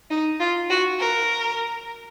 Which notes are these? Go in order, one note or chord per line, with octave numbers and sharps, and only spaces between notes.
D#4
F4
F#4
A#4